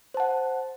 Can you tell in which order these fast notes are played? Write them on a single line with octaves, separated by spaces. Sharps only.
C5 A5 F#5